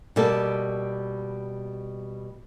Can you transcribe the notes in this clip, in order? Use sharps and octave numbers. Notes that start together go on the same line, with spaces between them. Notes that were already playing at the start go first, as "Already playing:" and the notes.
B2 G3 A#3 A4